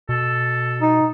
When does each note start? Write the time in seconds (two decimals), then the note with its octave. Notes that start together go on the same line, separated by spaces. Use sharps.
0.09 B2 A4
0.82 D#4